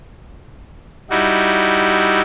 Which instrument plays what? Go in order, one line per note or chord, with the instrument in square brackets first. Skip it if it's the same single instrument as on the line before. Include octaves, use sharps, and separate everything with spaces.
[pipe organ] G3 D#4 E4 F#4